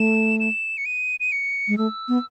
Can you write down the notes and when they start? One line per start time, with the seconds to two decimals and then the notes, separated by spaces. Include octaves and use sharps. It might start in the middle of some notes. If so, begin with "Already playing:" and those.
Already playing: A3 E7
0.40 E7
0.77 C#7
0.86 D#7
1.20 D#7
1.32 C#7
1.68 G#3
1.77 A3 E6
2.08 B3